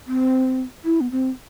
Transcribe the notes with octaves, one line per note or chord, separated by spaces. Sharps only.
C4
E4
B3
C4